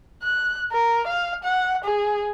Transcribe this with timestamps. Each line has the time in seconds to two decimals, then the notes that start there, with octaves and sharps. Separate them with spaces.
0.23 F#6
0.72 A#4
1.07 F5
1.44 F#5
1.84 G#4